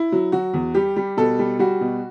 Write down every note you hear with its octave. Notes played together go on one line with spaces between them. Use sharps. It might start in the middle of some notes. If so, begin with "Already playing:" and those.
Already playing: E4
F#3
F#3 F#4
E2
G3 G4
G3
B2 A4
G3
G3 F#4
B2